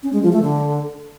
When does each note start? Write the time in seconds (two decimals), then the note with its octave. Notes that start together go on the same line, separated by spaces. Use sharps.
0.03 C#4
0.13 G#3
0.23 F3
0.32 A3
0.42 D3